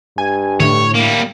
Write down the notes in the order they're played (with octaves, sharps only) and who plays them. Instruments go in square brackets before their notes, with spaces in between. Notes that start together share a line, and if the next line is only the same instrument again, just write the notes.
[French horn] G2 [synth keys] G#5
[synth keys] A2 [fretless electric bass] D3 D4 [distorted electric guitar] C#5
[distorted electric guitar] G3 A#3